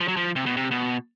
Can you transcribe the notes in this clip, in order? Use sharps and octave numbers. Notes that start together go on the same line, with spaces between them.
F3
F#3
F3
C3
B2
C3
B2